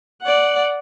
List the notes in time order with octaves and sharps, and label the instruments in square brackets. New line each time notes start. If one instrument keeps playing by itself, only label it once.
[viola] D5 F#5